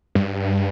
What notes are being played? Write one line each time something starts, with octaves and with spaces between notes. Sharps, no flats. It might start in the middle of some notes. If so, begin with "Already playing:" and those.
G2